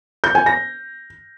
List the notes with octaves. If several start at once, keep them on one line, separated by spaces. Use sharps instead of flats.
G6
G#5
A#6